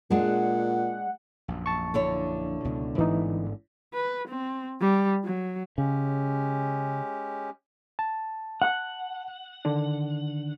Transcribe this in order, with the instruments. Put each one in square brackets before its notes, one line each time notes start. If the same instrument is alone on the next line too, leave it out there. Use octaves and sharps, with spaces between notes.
[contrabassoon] A#2 [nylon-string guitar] G#3 D4 [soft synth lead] F#5
[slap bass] A#1 F#2
[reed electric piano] A5 C#6
[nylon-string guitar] D3 E4 C#5
[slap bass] C#2 B2
[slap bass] A1 G#2 B3 [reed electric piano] E3 D#4
[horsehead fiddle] B4
C4
G3
F#3
[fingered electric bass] C#3 [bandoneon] G#3 C#4 G4
[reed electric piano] A5
[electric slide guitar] F#5
[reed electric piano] D3 D#3 D4